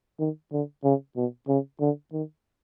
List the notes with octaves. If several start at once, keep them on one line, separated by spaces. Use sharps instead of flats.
D#3
D3
C#3
B2
C#3
D3
D#3